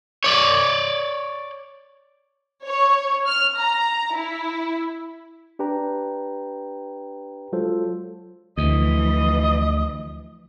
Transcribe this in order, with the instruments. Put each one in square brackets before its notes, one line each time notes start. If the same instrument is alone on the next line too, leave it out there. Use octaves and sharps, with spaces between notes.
[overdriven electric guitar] C#5 D5
[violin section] C#5
F6
A#5
E4
[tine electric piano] D4 G4 B4 G5 A#5
F#3 G#3 F4 A4 C5
[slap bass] D2 [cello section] E3 F3 [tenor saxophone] D#5